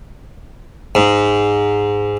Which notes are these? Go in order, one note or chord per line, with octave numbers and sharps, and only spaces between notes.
G#2